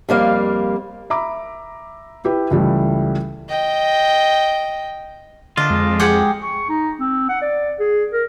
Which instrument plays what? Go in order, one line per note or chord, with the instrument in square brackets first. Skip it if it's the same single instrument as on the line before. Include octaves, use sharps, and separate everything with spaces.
[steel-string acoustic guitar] F2 G3 A#3 F5
[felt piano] E5 A#5 B5 D6
E4 G4 B4
C#2 E3 G3 A3
[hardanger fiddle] D#5 G5
[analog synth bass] D3 [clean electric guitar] D4 F4 [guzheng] D#5
[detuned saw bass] F2 [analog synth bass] G#3
[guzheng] G4 G#4 F#5
[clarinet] C#6
D#4
C4
F#5
D5
G#4
A#4